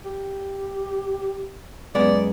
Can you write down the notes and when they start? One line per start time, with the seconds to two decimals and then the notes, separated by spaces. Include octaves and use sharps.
0.05 G4
1.95 F#2 G#3 B3 D5